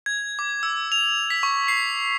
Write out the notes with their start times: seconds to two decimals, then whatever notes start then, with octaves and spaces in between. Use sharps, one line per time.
0.06 G#6
0.39 D6
0.63 E6
0.92 F7
1.30 B6
1.43 C#6
1.68 C7